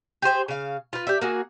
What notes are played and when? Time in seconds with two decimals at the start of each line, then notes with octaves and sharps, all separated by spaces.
0.22 G4 G#4 C5 G5
0.48 C#3 F5
0.93 F4 B4
1.07 G4 D5 E5
1.22 A#3 F#4 G#4